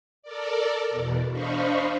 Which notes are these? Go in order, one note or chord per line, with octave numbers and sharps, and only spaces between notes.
A4 A#4 D5
E2 B2
D4 C5 D#5 F5 B5 C#6